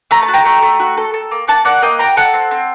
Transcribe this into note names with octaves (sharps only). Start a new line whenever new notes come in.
A3 A#5
A5
F#4
G5 A#5
A3
A3
F#4
A4
A4
A#3
A#3 F#5 A5
A#3 D5 F#5
A#3 D#5 G5
F#4 G5 A#5
A4 F#5 A5
C4
C4